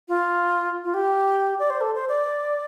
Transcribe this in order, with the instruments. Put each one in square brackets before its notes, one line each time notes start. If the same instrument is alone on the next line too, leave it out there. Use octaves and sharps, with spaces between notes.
[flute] F4
F4
G4
D5
C5
A4
C5
D5